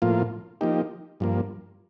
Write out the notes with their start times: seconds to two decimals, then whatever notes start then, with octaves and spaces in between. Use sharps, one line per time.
0.02 A2 F3 A#3 F4
0.61 F3 A#3 D#4 G4
1.20 G2 F3 A#3